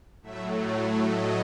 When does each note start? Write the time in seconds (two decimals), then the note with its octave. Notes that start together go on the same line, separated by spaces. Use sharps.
0.22 A2 F#3 A3 E5
1.08 D#5